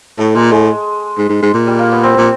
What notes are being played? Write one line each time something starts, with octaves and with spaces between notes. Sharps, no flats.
A2 A3
A#2 G#3
A2 G#3
G#2
G#2
G#2
A#2
G3
A#3
B3
C4
A#2